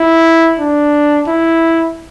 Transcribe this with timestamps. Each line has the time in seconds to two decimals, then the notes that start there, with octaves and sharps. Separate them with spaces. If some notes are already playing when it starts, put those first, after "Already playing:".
Already playing: E4
0.60 D4
1.27 E4